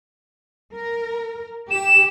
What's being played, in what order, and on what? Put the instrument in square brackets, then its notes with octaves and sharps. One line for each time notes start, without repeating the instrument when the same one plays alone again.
[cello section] A#4
[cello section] G4 [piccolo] E7